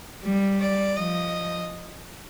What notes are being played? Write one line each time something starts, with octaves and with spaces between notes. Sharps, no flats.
G3
D5
F3 D#5